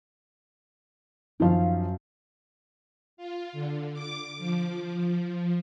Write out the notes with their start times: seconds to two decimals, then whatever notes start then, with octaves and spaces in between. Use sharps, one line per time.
1.40 F#2 D#3 F3 F5
3.17 F4
3.53 D3
3.94 D6
4.38 F3